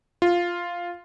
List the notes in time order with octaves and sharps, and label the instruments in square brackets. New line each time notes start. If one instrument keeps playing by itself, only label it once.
[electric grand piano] F4